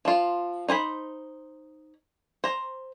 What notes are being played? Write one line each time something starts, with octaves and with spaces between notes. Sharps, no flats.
F3 F4
D#4 C5 G#5 B5
C5 A#5